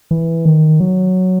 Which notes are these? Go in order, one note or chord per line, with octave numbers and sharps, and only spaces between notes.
E3
D#3
F#3